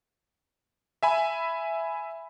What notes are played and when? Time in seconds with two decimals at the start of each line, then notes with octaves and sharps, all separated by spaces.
1.03 E5 G#5 B5